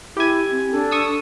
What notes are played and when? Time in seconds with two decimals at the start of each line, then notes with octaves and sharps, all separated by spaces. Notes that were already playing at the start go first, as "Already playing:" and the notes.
0.17 E4 G4 G#5
0.51 C4
0.73 D4 A4
0.91 C#6 D#6 E6